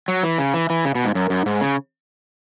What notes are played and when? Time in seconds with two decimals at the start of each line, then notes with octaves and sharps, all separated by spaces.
0.08 F#3
0.23 E3
0.38 C#3
0.54 E3
0.70 E3
0.85 C#3
0.95 B2
1.05 G#2
1.15 F#2
1.30 F#2
1.46 G#2
1.61 C#3